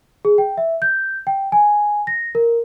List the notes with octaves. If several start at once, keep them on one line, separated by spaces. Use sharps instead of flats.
G#4
G5
E5
G6
G5
G#5
A#6
A#4